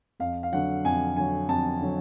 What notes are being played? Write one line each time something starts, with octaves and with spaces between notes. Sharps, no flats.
F2 F5
F5
D3 F#3 F#5
F2 G#5
D3 F#3 G#5
F2 A5
D3 F#3